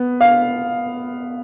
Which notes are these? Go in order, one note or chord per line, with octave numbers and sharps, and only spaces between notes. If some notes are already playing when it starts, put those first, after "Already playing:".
Already playing: B3
F5